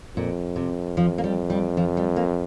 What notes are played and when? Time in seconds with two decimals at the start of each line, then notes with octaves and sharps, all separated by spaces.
0.17 F2 A#2
0.56 C3
0.97 F3
1.18 A#3
1.24 G3
1.50 G3
1.77 F3
1.97 G3
2.16 A#3